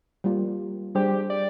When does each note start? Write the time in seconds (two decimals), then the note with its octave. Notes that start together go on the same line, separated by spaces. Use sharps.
0.24 G3 A#3 F4
0.95 G3 D4 G4 G#4 C5
1.30 D5